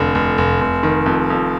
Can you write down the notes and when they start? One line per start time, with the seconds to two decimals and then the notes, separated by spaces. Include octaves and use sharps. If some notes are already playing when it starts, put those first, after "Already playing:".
Already playing: F1 D3
0.15 F1
0.38 F1
0.61 F1
0.83 D#3
1.06 F2
1.30 F2